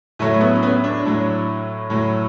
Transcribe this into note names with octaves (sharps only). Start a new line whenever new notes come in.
A2 F#3 A3
A3
B3
C#4
B3
D4
A2 F#3
A2 F#3